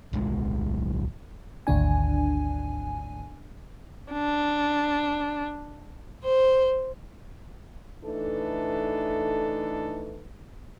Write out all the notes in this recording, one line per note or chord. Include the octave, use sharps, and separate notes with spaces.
D1 B1 G#3
G#1 D2 D4 G#5
D4
C5
E3 A3 D4 D#4 A4 B4